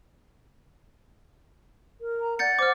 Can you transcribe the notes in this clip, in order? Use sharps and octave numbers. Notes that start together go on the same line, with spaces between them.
A#4
A#5
D5 F#5 G6 A6 C#7
C5 D6 F6